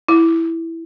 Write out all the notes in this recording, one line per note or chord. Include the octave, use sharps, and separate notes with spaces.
E4